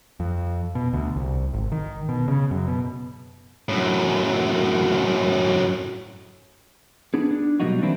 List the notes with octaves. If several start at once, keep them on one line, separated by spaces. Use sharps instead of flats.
F2
B2
D2
C2
G#1
D#3
B2
C#3
F#2
B2
F#2 A2
B3 D4 D#4 G#4
D4
B2 F#3 G3 A#3 D#4 F#4
E3 A#3 C4 D4 E4